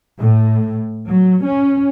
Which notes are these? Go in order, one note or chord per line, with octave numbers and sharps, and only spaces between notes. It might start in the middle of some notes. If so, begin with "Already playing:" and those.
A2
F#3
C#4